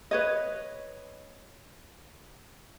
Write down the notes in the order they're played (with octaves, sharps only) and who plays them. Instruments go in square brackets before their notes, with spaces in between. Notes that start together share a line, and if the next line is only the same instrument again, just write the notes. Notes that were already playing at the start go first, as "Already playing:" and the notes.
[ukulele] B4 C#5 D#5